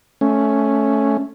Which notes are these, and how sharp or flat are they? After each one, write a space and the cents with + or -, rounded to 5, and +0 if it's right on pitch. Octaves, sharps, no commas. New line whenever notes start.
A3 -10 C#4 +0